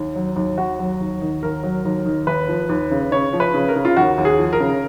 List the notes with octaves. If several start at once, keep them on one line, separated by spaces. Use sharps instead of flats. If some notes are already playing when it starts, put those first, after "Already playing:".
Already playing: D#2
F#3
D#2
D#2 F#4
F#3
D#2
D#3
D#2 A#4
F#3
D#2
D#3
D#2 B4
F3
D#2
C#3
C#3 C#5
F3
B4
C#3
A#4
C#3
F4
D#2 F#4
D#2
G#4
F3
A#4
C#3